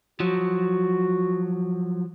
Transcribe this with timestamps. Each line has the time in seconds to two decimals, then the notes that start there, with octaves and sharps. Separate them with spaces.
0.20 F3 F#3 F#4